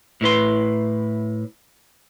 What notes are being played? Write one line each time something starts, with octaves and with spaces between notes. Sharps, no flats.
A2 E4 B4 C6